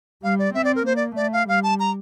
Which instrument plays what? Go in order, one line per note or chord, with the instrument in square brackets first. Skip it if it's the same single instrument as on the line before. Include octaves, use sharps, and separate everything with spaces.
[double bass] G3 [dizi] F5
[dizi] D5
[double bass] C4 [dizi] E5
[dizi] D5
A#4
[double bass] A#3 [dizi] C5
[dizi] D5
[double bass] A3 [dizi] D5
[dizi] F5
[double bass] G3 [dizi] F5
[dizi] A5
A#5